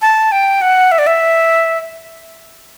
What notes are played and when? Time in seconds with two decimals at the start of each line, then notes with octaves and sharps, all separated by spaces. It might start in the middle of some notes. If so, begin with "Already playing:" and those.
0.02 A5
0.32 G5
0.62 F#5
0.92 E5
0.99 D5
1.07 E5